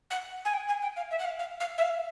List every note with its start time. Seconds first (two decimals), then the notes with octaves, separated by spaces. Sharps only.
0.10 F#5
0.45 G#5
0.53 G5
0.68 G#5
0.82 G5
0.96 F5
1.11 E5
1.19 F#5
1.25 F5
1.39 F5
1.60 F5
1.78 E5
1.82 F5